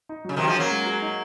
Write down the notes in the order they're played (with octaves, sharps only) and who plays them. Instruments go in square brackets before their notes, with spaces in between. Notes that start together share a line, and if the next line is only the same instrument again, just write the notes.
[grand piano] D#4
[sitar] C#3 [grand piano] F#3
[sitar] C3 D#3 [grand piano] F#4
[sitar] F3 G#3
[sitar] F#3 A#3 [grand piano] C#4
[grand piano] G#3
G#4
D#4